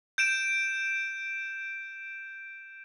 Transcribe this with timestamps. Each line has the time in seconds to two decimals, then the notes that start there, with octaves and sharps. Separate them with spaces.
0.18 G6 D7 E7